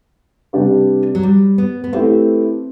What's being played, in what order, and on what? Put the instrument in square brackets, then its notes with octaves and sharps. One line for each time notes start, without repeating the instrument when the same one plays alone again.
[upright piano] C3 G3 D4 G4 B4
[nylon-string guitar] F#3
G3
B3
B3
[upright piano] A3 E4 G4 B4 [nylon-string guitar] C4